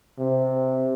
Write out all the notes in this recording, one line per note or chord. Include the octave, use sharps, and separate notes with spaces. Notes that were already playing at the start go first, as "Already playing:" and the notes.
C3